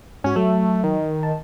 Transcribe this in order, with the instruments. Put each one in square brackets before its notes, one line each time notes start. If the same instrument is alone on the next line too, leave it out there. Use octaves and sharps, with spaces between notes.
[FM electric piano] G#2 F#4 [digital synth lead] C#4
[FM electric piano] F#3 [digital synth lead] A3
[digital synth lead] D#3
[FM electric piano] A5